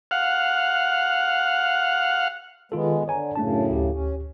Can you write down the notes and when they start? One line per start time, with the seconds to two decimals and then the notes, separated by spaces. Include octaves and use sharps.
0.11 F5 F#5
2.72 D#3 G#3 B3 F4 A4
3.08 D3 C#5 G#5 A#5
3.36 F#2 A2 C#3 A3 D4 A5
3.70 D2 G4
3.91 C#4